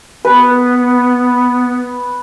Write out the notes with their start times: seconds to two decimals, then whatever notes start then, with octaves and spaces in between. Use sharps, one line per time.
0.25 B3 B4